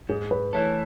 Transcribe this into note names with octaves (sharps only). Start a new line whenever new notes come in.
G#2 G#4
B4
E3 A3 E4 A4 C#5